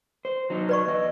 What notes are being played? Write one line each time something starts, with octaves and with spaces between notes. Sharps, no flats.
C5
F#3 D#4
B4 D5 C#6
E2 D#5